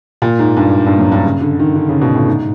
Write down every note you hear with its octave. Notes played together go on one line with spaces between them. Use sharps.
A#2
G#2
G2
G2
F#2
G2
C#3
D3
D#3
D3
C#3
B2
A2
G#2